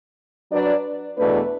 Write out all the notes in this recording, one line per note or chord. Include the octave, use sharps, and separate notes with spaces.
F#3 D4 B4 D5
E2 B2 A3 D4 B4